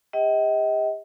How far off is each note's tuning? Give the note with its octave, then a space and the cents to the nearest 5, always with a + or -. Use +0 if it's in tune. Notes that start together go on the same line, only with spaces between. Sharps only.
G4 +45 D#5 +40 G5 -35